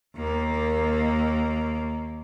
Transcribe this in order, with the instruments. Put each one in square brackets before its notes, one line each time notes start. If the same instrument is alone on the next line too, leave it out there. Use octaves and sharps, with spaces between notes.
[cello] D#2 A#3